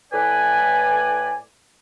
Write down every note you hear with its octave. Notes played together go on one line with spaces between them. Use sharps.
A2 B4 D5 G#5